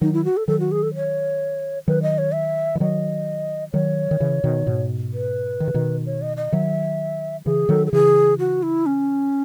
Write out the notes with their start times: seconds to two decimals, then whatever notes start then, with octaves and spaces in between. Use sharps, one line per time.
0.01 D#3 F#3 D#4
0.13 E4
0.25 F#4
0.37 A4
0.48 D#3 F#3 A4
0.60 F#4
0.72 G#4
0.83 A4
0.95 C#5
1.88 D#3 F#3 B4
2.02 D#5
2.18 C#5
2.34 E5
2.75 E3
2.80 D#3 F#3 D#5
3.73 D#3 F#3 C#5
4.11 D#3
4.20 C#3 E3
4.44 B2 D#3
4.67 G#2 B2
5.13 B4
5.60 D#3
5.68 C#3
5.74 B2 D#3
6.06 C#5
6.22 D#5
6.37 D#5
6.52 D#3 F#3 E5
7.45 C#3 E3 G#4
7.69 D#3 F#3 A4
7.87 A4
7.92 C#3 E3 G#4
8.39 F#4
8.63 E4
8.86 C#4